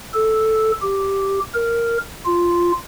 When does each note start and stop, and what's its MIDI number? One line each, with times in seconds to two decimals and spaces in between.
0.14 0.72 69
0.82 1.39 67
1.54 1.98 70
2.26 2.72 65